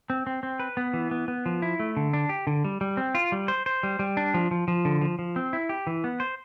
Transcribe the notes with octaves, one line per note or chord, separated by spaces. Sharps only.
C4
C4
C4
B4
B3
E3
B3
B3
F3
E4
A3
D3
D4
G4
D3
G3
G3
C4
F4
G3
C5
C5
G3
G3
D4
F3
F3
F3
D3
F3
F3
C4
E4
G4
E3
B3
C5